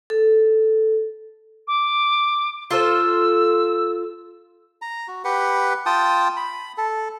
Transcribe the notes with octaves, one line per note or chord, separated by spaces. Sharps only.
A4
D6
F4 A4 C5 E6
A#5
F#4
G4 B4 F#5
F4 G5 A5 D#6
B5
A4